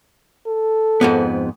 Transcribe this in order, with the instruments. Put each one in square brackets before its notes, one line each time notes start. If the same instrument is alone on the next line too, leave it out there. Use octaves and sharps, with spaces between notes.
[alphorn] A4
[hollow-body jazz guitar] F2 G#2 B3